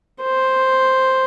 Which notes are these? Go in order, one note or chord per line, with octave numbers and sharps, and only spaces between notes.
C5